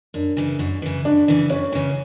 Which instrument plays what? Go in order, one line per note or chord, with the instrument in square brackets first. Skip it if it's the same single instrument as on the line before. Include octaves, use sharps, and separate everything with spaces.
[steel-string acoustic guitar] F#2 [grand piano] D4
[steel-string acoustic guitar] C#3 E3
F#2
C#3 E3
[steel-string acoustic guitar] F#2 [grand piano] D4
[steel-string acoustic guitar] C#3 E3
[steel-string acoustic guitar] F#2 [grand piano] C#4
[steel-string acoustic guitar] C#3 E3